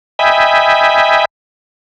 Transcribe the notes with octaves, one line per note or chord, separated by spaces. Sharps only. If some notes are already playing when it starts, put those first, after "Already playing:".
D#5 E5 G5 G#5 B5